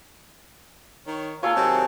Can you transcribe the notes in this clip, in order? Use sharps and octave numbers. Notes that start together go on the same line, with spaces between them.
D#3 C#5
A#3 F4 G#4 A4 C#5
C3 D#3 F#3